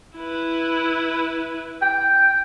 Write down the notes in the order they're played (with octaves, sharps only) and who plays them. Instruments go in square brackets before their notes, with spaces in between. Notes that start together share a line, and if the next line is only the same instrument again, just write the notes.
[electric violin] E4 B4
[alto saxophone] G5